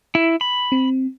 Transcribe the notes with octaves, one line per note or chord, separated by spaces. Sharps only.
E4
B5
C4